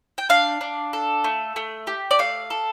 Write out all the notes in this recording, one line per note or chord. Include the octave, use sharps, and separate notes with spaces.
G5
D4 F5
D4
A4
A3
A3
G4
D5
A3 F5
A4